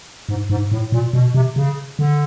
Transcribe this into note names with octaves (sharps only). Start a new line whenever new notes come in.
G#2
G#2
A2
A#2
B2
C3
C#3
D3